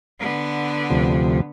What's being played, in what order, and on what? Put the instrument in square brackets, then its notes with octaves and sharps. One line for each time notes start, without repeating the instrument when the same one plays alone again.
[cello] D3 B3
[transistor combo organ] D2 C3 F3